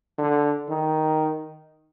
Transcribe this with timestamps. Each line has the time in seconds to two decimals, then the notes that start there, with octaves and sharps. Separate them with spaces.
0.18 D3
0.69 D#3